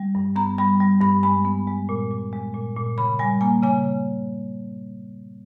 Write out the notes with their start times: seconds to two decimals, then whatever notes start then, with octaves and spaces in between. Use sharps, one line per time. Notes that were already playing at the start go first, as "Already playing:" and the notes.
Already playing: G3
0.15 G2
0.36 B3 A#5
0.58 G3 B5
0.80 G3
1.01 G2 B5
1.23 G#3 B5
1.45 B3
1.67 G#3
1.89 A#2
2.11 A#2
2.33 G#3
2.54 A#2
2.77 A#2
2.98 C#3 B5
3.19 G3 G#5
3.41 A#3 G#5
3.63 C#3 G#5
3.85 C#3